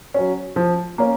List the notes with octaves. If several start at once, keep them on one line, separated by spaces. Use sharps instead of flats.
F#3 C#4
F3
A#3 C#4